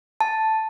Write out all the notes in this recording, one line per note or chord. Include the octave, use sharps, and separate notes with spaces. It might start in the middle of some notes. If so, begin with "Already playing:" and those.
A5